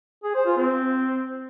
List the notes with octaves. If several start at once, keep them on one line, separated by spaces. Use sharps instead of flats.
G#4
C5
F4
C4